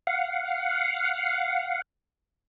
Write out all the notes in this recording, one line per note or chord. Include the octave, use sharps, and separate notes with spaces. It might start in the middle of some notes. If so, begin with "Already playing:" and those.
F5 F#5